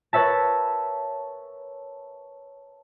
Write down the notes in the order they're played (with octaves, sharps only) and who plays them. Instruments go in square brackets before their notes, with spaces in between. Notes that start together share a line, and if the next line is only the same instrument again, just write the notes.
[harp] A#4 B4 C#5 E5 A5